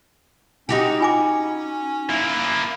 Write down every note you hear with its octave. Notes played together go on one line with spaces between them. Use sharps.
C#4 D#4 F#4 G4
F4 G#5 D6
A#3 E4